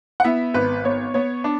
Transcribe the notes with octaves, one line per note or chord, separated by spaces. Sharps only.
F#5
B3 E4 E5
G#1 B4
B3 C#5
B3 C#5
D4